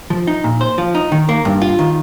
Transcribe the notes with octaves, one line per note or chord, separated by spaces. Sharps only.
F3
D#4
A#2
C5
F3
D#4
D#3
A#3
G2
F4
D#3